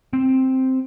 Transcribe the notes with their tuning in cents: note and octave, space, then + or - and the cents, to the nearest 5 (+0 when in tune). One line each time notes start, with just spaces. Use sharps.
C4 +0